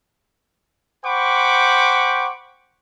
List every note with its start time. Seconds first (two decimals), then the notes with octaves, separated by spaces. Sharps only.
1.05 C5 F#5 G5 B5 C#6 D6